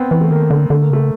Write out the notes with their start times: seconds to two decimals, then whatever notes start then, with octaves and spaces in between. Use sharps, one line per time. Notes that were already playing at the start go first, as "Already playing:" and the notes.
Already playing: B3 C4
0.11 E3
0.21 A3
0.31 D#3 A#3
0.51 D3
0.70 D3 A3
0.81 A#3
0.90 C#3 A3